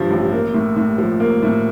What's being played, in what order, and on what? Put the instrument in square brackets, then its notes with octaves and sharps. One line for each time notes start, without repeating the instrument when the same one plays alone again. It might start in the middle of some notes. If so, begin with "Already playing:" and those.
Already playing: [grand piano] G2 F3
A1
A#3
A2
A2
F3
A#3
A2